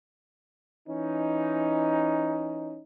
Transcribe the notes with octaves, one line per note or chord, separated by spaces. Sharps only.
E3 C#4 D#4